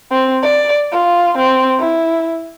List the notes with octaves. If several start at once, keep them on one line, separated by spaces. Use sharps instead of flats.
C4
D5
F4
C4
E4